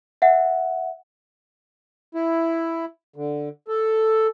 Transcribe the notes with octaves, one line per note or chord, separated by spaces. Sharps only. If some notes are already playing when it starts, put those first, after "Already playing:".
E5 F#5
E4
D3
A4